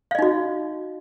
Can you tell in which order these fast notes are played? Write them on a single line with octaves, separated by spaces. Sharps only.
F5 D#5 D#4 F#4